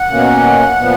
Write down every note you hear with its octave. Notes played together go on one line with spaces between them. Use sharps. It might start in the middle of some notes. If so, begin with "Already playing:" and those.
Already playing: F#5
B2 A#3 C#4
A#2 F3 B3